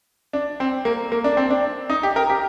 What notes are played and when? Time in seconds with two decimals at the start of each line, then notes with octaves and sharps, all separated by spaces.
0.33 D4
0.60 C4
0.85 A#3
1.12 A#3
1.24 D4
1.37 C4
1.50 D4
1.90 D#4
2.03 G4
2.16 A#4
2.30 G4